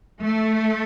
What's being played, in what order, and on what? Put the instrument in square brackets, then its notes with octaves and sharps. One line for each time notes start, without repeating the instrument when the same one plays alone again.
[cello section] A3